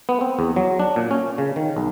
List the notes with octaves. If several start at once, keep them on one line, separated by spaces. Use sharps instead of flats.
B3
C4
E2
F#3
D4
A#2
C#4
C#3
D#3
B1